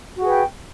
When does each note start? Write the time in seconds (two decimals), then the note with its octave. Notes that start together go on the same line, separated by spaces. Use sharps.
0.17 F#4
0.20 G#4
0.24 B4
0.27 G5